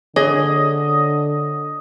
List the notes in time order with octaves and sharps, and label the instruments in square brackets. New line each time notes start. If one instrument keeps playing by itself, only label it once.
[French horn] D3 [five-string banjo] G#4 [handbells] C#5 [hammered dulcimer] D#5